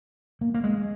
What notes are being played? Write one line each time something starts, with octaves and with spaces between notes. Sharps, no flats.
A#3
A#3
G#3